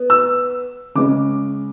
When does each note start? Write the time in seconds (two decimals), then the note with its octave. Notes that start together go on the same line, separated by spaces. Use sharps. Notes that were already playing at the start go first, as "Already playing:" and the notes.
Already playing: B3
0.10 E6
0.95 C#3 G#3 C#4 D6